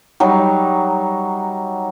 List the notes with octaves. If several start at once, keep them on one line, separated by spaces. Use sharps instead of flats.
F#3 G3 D#4